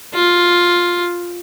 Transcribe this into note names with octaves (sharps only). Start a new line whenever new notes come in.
F4